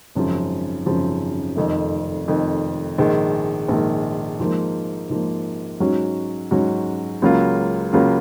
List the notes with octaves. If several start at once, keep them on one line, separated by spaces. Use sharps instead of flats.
G#1 F#2 C#3 F3
G#1 F#2 C#3 F3
F1 F2 D#3
F1 F2 D#3
A#1 G#2 D#3 G#3
A#1 G#2 D#3 G#3
G#2 F3 A#3
G#2 F3 A#3
G#2 F#3 C#4 F#4
G#2 F#3 C#4 F#4
C#2 C#3 F#3 A#3 F4
C#2 C#3 F#3 A#3 F4